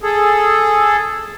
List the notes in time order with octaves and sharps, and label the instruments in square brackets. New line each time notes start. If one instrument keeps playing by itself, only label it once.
[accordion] G#4 A4